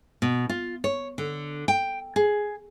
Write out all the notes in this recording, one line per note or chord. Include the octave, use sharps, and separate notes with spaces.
B2
F4
C#5
D3
G5
G#4